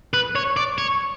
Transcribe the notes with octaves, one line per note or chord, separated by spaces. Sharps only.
B4
C#5
D5
C#5